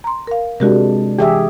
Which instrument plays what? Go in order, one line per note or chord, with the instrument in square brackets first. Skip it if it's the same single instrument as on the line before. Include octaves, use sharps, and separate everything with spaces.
[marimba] A#5 C6
A#4 F5
[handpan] C3 G#3 D4 [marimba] F#4 G4 A#4
[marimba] E3 [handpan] G4 G#4 E5